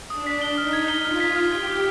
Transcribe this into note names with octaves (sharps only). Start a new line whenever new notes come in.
D4 D#6
B6
G7
D#4 F6
G#6
G7
F4 F6
B6
F6
G4 G#6
B6